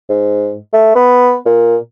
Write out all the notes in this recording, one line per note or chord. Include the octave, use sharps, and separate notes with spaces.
G#2
A3
B3
A#2